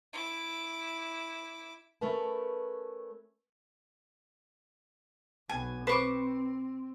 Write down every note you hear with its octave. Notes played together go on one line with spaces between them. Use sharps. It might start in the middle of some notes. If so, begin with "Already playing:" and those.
E4 D6
A3 C#4 A#4 B4 A5
B1 B3 G#5
C4 B4 C5 C#6 D6